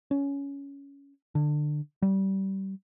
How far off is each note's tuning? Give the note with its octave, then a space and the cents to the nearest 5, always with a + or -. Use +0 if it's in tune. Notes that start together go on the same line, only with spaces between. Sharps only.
C#4 +15
D3 +25
G3 -25